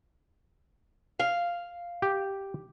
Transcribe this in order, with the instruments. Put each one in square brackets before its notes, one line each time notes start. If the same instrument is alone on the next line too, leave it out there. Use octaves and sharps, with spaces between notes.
[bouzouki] F5
[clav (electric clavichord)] G4